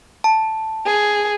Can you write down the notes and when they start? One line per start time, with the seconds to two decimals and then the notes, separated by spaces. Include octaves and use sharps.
0.24 A5
0.86 G#4